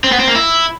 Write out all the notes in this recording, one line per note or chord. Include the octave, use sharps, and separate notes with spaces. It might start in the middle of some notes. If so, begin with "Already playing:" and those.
C4
B3
C4
A#3
E4